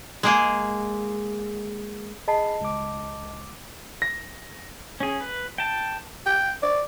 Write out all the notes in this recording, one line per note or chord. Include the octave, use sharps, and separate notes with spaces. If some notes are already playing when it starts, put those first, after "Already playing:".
G#3 A#3 G#4
G#4 D#5 A5 B5 C7
C#2 D6
A#6
C#4 G#4
B4
G5 A5
G5
D5